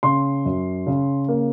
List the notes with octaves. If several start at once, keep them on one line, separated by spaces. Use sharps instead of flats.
C#3 C6
F#2
C#3
A#3